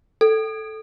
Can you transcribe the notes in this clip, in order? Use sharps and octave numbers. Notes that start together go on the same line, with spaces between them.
A4